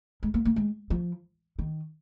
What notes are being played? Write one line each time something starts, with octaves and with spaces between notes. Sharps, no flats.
G#3
A#3
A#3
G#3
F3
D#3